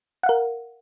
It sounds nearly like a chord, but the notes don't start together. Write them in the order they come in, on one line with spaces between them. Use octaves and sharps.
F#5 F5 A#4